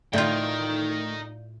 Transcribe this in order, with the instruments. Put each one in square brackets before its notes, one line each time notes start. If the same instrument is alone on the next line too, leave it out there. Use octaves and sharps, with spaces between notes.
[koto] A2 F4 [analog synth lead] A3 [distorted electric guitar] D#4 G5 [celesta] D5 F5 G6